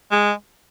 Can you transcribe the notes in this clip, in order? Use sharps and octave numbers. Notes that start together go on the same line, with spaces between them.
G#3